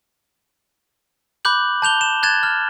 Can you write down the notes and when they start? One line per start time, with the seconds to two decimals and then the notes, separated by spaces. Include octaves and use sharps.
1.45 B5 D6 F#6 G6 F#7
1.82 A5 G6 F7 G7
2.01 E7
2.23 F#6 G#6 A6 E7
2.43 F6